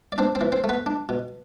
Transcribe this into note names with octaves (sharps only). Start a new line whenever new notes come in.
D5
C4 D4 C5
C4 C5
E3
C4 C5
A3
B3 B4
D4
B2